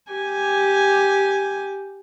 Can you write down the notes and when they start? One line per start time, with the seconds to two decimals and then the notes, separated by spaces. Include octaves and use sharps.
0.12 G4 G#5